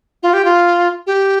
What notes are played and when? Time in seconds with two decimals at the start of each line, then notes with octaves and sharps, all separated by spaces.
0.23 F4
0.33 G4
0.45 F4
1.07 G4